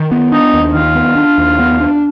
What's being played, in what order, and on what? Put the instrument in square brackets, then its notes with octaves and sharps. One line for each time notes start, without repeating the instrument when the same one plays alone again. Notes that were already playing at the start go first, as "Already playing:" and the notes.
Already playing: [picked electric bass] D#3
B3
[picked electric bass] D4 [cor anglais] D#4
[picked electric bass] D#2
[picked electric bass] D#3 [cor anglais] F4
[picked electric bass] B3
D4
D#2
B3
D4